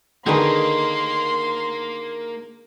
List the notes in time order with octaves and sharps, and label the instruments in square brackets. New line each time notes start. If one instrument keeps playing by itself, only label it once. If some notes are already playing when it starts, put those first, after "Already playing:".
[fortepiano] D3 D#3 G#4 [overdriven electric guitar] A#3 [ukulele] D#4 A#4 B4 [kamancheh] C6